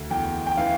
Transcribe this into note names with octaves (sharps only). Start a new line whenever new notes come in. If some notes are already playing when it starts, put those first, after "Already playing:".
Already playing: D2
E2 G5
G5
E3 F5